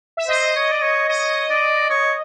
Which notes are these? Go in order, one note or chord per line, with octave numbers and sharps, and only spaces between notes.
E5
C5 D#5
C#5
D5
C#5
C#5 D#5
D5
C#5